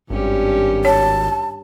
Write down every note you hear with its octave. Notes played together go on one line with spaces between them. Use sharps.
G#1 G2 C#4 G4
C#5 A5